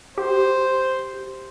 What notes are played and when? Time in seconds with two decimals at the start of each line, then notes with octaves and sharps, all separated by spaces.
0.18 G4 C5